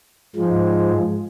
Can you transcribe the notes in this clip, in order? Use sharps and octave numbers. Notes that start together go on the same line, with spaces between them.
G#2 F3 G#3